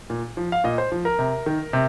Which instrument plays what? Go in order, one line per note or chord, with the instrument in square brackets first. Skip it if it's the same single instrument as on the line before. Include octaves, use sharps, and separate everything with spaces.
[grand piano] A#2
F3
F5
A#2 D#5
C5
F3
A#4
C3
D#3
C3